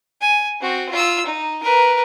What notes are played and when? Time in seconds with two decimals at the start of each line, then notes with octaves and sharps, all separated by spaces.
0.21 G#5
0.61 C4 F#4
0.91 F4 E6
1.26 D#4
1.63 A#4 B4